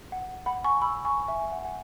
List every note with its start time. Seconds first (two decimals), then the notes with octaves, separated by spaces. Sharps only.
0.12 F#5
0.46 F#5 B5
0.64 G#5 C#6
0.82 B5 E6
1.05 G#5 C#6
1.28 E5 G#5
1.52 F#5
1.59 G#5
1.65 F#5